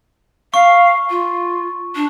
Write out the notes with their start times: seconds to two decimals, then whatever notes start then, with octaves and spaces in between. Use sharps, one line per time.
0.54 F5 C#6
1.10 F4
1.95 D4